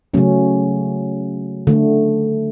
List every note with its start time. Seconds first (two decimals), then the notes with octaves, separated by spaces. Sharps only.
0.14 C#3 F#3 A3 C#4
1.67 D3 A3